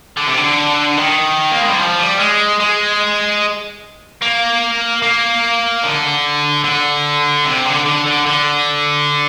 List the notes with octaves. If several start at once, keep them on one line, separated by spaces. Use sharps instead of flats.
D3
C3
D3
D#3
A#3
G#3
G3
F3
G3
G#3
G#3
A#3
A#3
D3
D3
C3
D3
D3
D3
D3